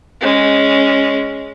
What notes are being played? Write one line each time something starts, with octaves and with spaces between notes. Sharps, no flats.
G#3 C#4